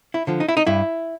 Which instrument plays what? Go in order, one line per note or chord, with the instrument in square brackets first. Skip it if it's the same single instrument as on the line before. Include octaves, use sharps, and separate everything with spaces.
[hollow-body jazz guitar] E4
D3 F3
D#4
E4
D#4
G2 E4